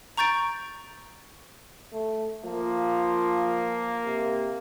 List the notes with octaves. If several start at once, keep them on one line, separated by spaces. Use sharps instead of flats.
A#5 C#6 G6 A6 D7
A3
F3 A#3
C3